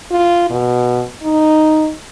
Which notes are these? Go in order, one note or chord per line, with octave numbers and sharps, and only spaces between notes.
F4
B2
D#4